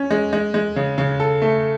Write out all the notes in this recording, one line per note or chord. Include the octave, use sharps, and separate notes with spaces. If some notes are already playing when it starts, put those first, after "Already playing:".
Already playing: C#4
G#3
G#3
G#3
C#3
C#3
A4
A3